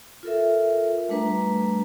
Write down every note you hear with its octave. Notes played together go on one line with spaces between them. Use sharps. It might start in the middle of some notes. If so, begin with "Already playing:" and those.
F4 A4 A#4 E5
G3 A3 D4 B4 A#5